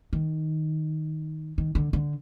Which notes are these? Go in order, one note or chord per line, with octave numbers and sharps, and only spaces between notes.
D#3
D#3
D3
D3